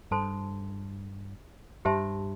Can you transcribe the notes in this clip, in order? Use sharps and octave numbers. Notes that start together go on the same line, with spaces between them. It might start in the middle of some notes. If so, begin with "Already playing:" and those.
G2 A4 C5 A5 C6
G2 G4 C5 E5 A5 C6